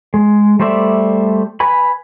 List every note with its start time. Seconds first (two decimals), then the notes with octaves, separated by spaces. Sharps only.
0.14 G#3
0.60 G3 A3 C5 D5 E5
1.60 B4 G#5 B5